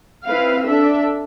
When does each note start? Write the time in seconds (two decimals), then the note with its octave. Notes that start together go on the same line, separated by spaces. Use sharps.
0.26 C4 E4 B4 F5
0.66 D4 A4 E5